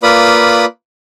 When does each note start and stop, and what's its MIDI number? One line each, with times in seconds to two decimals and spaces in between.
0.03 0.65 58
0.03 0.65 65
0.03 0.65 71
0.03 0.65 74
0.03 0.65 83
0.03 0.65 87